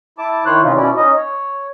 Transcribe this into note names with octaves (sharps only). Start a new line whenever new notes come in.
E4 A5 D6
D#3 E4 C5 C#5 F#6
C3 D#3 E3 C#4 D#4 F4
B2 C#4 E4 D5
C#4 D#4 D#5
C#5